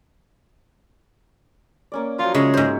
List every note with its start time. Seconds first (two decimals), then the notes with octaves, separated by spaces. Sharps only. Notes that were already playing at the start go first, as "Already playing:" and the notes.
1.92 A#3 C#4 D5
2.19 F3 F#3 F4
2.34 C#3 G#3 C#5 E5
2.54 G#2 C5